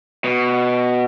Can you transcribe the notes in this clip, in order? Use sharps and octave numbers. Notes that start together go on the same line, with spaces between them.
B2